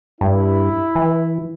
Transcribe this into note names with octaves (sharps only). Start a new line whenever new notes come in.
G2 E4
E3